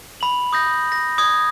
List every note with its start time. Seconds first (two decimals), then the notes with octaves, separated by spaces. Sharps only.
0.21 B5 F#7
0.53 D#6 G6 A#6
0.92 A#6
1.18 D#6 G#6